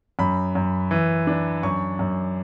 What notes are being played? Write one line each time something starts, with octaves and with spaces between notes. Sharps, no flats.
F#2 B5
F#2
E3
D4
F#2 C#6
F#2